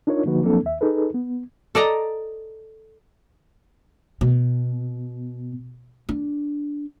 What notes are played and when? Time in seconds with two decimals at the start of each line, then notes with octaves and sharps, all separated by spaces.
0.07 D4 D#4 F4 A#4 C#5
0.26 D3 F3 A#3 D#4 F#4 B4
0.42 F3 F#3 A#3 C4 D4 A4
0.64 D#2 E5
0.81 D#4 G#4 A4 B4
1.14 B3
1.75 A4 D5 D#5 A#5
4.21 B2
6.09 D4